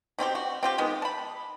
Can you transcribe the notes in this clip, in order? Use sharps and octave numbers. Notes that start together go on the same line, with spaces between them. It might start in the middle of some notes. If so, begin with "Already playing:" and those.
B2 C4 E4 G4
F#4
C4 F4 G4
D#3 G#3 B3
A5 B5